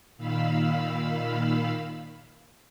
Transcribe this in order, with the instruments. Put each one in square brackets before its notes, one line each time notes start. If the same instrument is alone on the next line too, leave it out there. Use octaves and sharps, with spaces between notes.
[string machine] A#2 D#3 F5 B5 E6